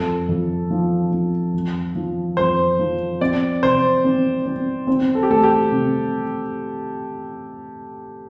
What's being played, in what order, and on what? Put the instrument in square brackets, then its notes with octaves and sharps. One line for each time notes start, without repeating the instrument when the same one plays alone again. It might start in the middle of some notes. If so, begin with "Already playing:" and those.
Already playing: [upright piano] F2 [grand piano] A4
[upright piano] F2
F3
F3
F2
F3
[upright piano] F2 [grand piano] C5
[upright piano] F3
[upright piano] C4 [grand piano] D5
[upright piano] C3 [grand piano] C5
[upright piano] C4
C4
C4
[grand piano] A4
G4
[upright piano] A3 [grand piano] A4
[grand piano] G4
[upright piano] C3